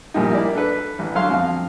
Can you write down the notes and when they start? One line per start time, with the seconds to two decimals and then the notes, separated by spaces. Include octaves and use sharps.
0.14 A#1 A#2 G3 D#4
0.31 E4 A#4 D5
0.55 D4 A4 B4
0.99 A1
1.15 D3 F#3 A4 F5 C6 F6
1.30 F2 F5